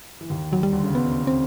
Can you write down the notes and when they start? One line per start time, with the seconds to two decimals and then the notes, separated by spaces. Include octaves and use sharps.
0.21 E3
0.30 D#2 D#3
0.51 D#2 D#3 F#3
0.63 G3
0.73 D2 D3
0.84 C#3
0.95 D2 D3 B3
1.27 C4